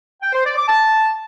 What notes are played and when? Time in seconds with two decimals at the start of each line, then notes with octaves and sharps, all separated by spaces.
0.22 G5
0.33 C5
0.44 D5
0.56 D6
0.67 A5